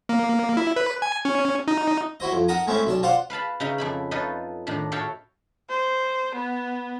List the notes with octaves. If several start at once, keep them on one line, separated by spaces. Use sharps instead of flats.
A#3
E4
B4
G#5
C#4
D#4
E4 F#4 C5 D#5
F2
D#4 A#4 F#5 A5 A#5 D#6
G#3 A3 C4 C#4 E4
B1 D4 A5
F4 C5 D5 F5 F#5 C6
B4 F5 A5 B5
C#3 C#4 D#4 D#5 E5 A#5
F2 E4 B5
D#4 F4 A4 B4 C#5 D#5
A2 D#3 D4
F#4 A4 C#5 E5 F5 G5
C5
B3